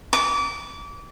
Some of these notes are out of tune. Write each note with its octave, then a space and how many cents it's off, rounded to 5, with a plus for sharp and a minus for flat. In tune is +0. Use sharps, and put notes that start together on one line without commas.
D6 -30